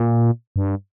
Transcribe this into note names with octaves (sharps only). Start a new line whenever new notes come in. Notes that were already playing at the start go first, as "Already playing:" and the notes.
Already playing: A#2
G2